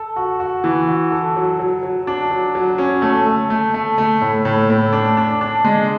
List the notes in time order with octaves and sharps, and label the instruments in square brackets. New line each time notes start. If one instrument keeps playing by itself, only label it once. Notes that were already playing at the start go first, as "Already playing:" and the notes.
Already playing: [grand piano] A4
F#4
F#4
E3
F#4
A4
F#3
F#3
F#3
D4
F#3
F#3
C#4
A3
A3
A3
A3
A3
A2
A2
A2
D4
D4
D4
G#3